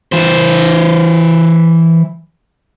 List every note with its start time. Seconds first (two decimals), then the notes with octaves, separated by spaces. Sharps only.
0.12 E3 C5